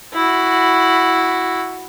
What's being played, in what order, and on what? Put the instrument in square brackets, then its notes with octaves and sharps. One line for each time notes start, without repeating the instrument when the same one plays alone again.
[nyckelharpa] E4 F#4